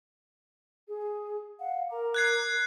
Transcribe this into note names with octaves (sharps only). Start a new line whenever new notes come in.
G#4
F5 F#5
A#4 A#5 D6
F#6 G#6 C7